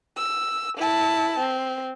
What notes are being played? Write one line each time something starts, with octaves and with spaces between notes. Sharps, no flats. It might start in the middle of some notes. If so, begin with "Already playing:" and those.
E6
E4 A5
C4